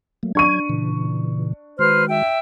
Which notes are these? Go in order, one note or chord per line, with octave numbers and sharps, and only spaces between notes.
F#3 A3 A#3
F#3 D4 C#6 G#6 D#7
A#2 C#3 E3
D#3 G#3 F#4 B4 C5 F6
E5 G5